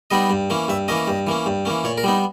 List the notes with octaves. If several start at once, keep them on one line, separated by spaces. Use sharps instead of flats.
G3 B3 D#4 D#5
G2
E3 A#3 C#4
G2 E5
E3 A#3 C#4 D#5
G2
E3 A#3 C#4
G2
E3 A#3 C#4
A#2 C#5
A#4
G3 B3 D#4